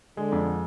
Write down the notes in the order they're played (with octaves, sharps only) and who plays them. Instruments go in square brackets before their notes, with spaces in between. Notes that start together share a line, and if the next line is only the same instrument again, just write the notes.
[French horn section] D3 [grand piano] G#3
[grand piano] F2